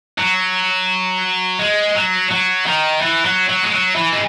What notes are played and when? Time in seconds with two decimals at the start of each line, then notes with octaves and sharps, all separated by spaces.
0.18 F#3
1.60 G#3
1.95 F#3
2.31 F#3
2.66 D#3
3.02 E3
3.25 F#3
3.49 F#3
3.63 G#3
3.72 F#3
3.95 E3
4.13 G#3